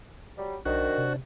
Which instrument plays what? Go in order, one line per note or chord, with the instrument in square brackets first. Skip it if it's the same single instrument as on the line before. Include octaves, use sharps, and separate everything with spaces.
[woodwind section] F#3 G3
[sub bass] B1 [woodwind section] D#3 [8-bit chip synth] D4 C5 D5 [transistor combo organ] F#4
[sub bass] C3